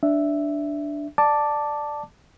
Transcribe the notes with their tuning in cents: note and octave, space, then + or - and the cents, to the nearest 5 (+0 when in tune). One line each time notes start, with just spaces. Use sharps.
D4 +0 E5 +0
D5 +10 A5 +0 D6 +0